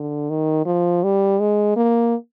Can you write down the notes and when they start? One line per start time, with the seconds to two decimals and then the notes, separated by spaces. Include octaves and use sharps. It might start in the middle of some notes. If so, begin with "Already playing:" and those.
Already playing: D3
0.30 D#3
0.66 F3
1.04 G3
1.40 G#3
1.76 A#3